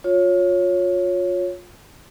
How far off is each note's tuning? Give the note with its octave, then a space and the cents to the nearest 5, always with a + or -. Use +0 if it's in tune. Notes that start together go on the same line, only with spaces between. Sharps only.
F4 +30 C#5 +0